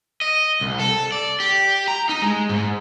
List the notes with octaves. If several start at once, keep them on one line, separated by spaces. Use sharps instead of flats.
D#5
C2
A4
D5
G4
A#5
D#4
G#3
G#2